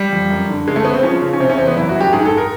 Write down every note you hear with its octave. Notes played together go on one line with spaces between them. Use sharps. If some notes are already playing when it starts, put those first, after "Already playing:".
Already playing: G3
F2
F#2
D3
C#3 G#3
A3
C#3 B3
C4
F3 C#4
C#3
C#4
C3 C4
C#4
E2 C4
B3
F#2 E4
F#4
F#2
G4
G#2 G#4
A4
A#4